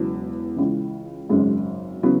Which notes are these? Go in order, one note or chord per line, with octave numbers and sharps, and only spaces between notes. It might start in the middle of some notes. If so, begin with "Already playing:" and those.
Already playing: E1 E2 C#3 F#3
C#2 C#3 E3
G#1 F#2 C#3 G#3
C#3 E3 F#3 B3